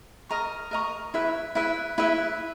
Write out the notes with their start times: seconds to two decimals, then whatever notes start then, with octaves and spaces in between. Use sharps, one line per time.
0.29 A#4 D#5 A#5 C#6
0.71 A#4 D#5 A#5 C#6
1.14 E4 B4 E5
1.55 E4 B4 E5
1.98 E4 B4 E5